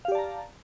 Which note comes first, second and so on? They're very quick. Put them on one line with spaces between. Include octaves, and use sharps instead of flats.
F5 G4 D5 A5 A#5